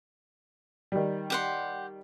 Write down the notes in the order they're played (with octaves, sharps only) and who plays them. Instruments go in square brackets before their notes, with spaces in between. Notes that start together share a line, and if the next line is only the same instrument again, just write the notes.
[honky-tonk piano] D#3 G3
[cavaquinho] G4 F#5 C6